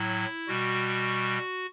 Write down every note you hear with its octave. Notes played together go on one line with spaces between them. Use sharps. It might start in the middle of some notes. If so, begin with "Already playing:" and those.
Already playing: A2 F#3 E4
B2 G3 F#4